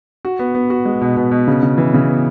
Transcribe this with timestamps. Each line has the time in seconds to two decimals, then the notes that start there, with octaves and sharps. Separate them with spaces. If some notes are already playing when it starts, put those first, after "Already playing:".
0.25 F#4
0.39 B3
0.55 B3
0.70 F#4
0.85 G#3
1.01 B2
1.17 B2
1.31 B2
1.48 C#3
1.63 C#3
1.78 E3
1.94 C#3
2.09 B3